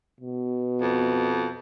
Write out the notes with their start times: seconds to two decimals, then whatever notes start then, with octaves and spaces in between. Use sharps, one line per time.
0.20 B2
0.81 F2